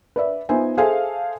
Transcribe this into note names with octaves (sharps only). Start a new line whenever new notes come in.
B4 D5 E5
B3 D#4 F4 C5 E5 G#5
G#4 A4 C5 E5 F5 G#5